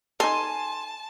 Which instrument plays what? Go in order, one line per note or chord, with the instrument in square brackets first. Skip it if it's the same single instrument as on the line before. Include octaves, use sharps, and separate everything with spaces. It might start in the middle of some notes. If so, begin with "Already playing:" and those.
[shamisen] D#4 A4 [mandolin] G#5 C6 [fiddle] A5